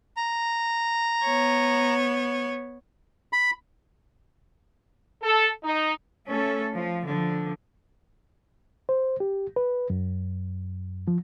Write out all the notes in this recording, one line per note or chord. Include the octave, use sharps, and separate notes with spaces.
A#5
B3 C#5
B5
A4
D#4
A3 C#4 A4
F3
D3 F3
C5
G4
B4
F#2
F3